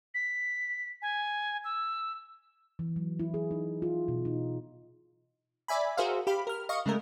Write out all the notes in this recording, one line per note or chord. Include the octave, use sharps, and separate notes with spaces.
B6
G#5
E6
E3
F#3
E4
G#4
D#4
F4
B2
D#4
D5 E5 G#5 B5
F#4 G#4 A#4 C5 E5 F5
G4 F5 B5
A#4 F6
D#5 F5 C#6
C#3 G#3 A3 A#4